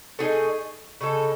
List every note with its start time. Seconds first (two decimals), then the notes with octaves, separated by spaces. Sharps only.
0.19 A3 D#4 G#4 D#5
1.01 C#3 G#3 D#4 A4